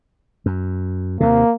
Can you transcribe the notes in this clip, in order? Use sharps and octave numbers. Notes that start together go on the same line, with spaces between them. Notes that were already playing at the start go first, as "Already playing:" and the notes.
F#2
D#2 C3 A#3